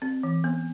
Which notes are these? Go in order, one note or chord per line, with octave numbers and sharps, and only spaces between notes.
C4
E3
B3